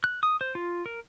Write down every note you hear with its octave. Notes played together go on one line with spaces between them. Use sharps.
F#6
D#6
C5
F4
A#4